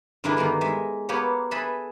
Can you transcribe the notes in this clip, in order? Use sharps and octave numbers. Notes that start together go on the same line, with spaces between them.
G2 D3 G#3 A#3 D4 E4
D#3 G3 A#3 B3
G#3 E5
A#3 B3 G4 C#5
G#4 A4 B4 E5 B5